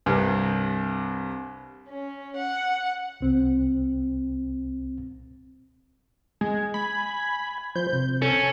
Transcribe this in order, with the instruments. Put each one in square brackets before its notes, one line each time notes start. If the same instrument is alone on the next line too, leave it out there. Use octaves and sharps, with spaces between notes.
[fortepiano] C2 G2 C3
[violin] C#4
F#5
[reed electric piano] C2 C4
[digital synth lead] G#3 [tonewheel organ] G#5
[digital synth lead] B5
[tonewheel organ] F3 C5 [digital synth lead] G6
[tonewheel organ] C3
[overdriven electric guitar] C#4 [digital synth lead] A4